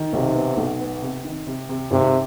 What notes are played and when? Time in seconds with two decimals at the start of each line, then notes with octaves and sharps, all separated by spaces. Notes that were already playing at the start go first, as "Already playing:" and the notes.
Already playing: D#3
0.13 B1 C3
0.35 B3
0.57 B1
0.80 B3
1.02 C3
1.24 D#3
1.47 C3
1.69 C3
1.91 G#1 C3